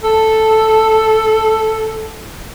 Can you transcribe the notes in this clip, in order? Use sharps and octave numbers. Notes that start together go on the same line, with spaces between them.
A4 A5